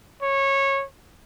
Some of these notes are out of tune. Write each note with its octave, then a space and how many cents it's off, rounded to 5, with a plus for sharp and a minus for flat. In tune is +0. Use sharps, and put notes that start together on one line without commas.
C#5 -20